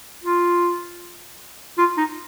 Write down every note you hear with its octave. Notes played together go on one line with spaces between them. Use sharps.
F4
F4
D#4